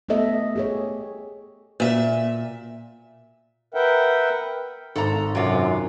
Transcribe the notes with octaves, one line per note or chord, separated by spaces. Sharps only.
A3 B3 G4 A4 D#5 E5
G4 G#4 C#5
A#2 E5
A#4 B4 E5 F#5 G5
G#1 G#2 A4 A#5
F#2 C3 F4